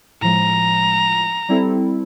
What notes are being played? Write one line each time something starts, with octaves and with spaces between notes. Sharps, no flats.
A2 F3 G#3 A#5
G3 C4 E4 A4